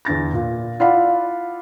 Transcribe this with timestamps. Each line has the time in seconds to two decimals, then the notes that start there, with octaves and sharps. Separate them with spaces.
0.05 E2 D3 A6 A#6
0.33 A#2
0.80 E4 F4 D5 F5 F#5 B5